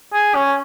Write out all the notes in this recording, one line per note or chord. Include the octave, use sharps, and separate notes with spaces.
G#4
C#4